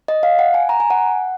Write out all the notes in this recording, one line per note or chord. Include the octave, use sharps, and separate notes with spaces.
D#5
F5
F#5
G#5
A#5
G#5
F#5